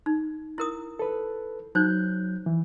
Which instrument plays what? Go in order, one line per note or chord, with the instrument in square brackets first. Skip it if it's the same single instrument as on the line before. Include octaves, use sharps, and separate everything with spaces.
[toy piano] D#4
E4 A#4 D#6
[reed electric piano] A4 B4
[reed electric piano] F#3 F#6 G6 [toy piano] D#4 C5
[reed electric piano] E3